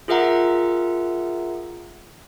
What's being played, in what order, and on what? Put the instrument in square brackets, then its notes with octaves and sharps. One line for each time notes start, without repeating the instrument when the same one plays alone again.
[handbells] F4 G#4 A#4 E5 F#5 A#5